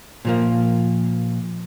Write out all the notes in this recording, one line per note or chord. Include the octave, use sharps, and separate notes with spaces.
A#2 F3 A#3